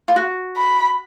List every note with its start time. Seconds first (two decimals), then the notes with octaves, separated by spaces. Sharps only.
0.08 F4
0.16 F#4
0.57 B5